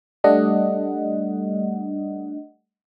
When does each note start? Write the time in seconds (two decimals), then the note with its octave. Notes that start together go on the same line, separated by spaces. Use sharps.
0.24 G3 A3 D4 D#5 F#5